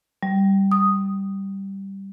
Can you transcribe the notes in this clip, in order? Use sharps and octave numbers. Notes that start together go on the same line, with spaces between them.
G3
D#6